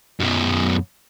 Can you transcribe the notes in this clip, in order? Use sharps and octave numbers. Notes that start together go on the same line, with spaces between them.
F#2 B2